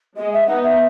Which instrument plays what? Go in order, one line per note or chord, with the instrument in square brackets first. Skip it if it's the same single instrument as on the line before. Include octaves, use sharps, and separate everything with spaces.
[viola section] G#3 [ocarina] D#5
[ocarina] E5
[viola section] B3 D#4 [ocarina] F#5
[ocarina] E5